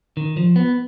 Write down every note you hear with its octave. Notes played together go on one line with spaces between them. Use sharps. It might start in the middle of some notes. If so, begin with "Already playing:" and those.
D#3
F3
B3